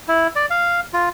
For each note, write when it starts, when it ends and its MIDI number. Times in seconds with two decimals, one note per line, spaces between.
0.08 0.27 64
0.36 0.46 74
0.50 0.81 77
0.93 1.09 65